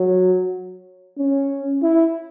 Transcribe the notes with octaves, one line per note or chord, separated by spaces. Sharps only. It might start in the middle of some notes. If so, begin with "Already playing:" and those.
Already playing: F#3
C#4
E4